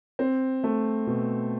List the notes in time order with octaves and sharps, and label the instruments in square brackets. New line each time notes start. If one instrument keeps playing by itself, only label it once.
[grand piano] C4
A3
B2